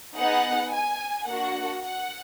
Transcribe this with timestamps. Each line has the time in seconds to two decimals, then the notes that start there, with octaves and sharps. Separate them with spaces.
0.16 B3 D#4 G#4 F#5
0.72 G#5
1.27 A#3 D4 F#4 F#5
1.83 F#5